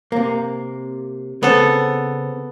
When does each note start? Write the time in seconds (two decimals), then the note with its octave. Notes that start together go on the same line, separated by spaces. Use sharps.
0.12 C3 A#3
1.43 C#3 B3 C4 A4